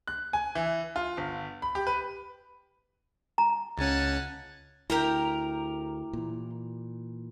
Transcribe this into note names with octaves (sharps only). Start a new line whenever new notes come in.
F#6
G#5
E3
F4
G1
B5
G4
B4
A#5
C#2 C#4 F#5 G#5 A5
D2 E4 G4 A#4 A#5
A#2 E3